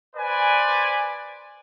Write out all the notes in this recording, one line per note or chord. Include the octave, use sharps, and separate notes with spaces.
B4 C5 D5 G#5